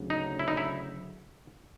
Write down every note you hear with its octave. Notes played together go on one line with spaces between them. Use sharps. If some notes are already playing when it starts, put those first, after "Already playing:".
Already playing: D2 C#3 F#3
D#4
E4
D#4
E4